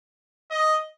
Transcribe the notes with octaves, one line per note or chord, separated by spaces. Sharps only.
D#5